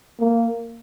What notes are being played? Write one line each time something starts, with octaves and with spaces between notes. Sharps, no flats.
A#3